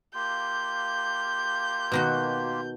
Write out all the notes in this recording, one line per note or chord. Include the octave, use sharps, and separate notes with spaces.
A#3 F4 G4 G6
B2 D#3 F#4